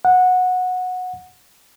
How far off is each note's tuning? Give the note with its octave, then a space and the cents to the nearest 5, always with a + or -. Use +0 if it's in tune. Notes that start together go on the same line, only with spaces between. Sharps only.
F#5 -15